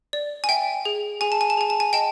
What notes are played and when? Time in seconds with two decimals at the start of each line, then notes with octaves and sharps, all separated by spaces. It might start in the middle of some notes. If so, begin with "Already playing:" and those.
0.13 D5
0.44 G#5
0.49 E5 G5
0.85 G#4
1.21 G#4 G#5
1.32 A5
1.41 G#5
1.50 A5
1.57 G#4 G#5
1.70 A5
1.80 G#5
1.93 D#5 G5 A5